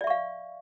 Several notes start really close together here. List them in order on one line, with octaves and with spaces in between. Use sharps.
D5 E5 C#6 F5